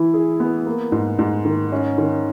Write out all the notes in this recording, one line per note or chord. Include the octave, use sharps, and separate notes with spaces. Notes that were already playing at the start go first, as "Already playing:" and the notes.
Already playing: E3 E4
G#4
B3
A#3
G#2
G#2
D#3
C#4
D#3